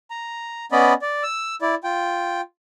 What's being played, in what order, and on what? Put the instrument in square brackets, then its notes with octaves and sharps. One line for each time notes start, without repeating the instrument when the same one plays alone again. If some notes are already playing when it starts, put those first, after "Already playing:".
[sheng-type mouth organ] A#5
B3 C#4 D5 D#5 B5
D5
E6
E4 D5
F4 G5